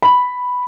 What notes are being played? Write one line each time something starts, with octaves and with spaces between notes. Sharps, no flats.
B5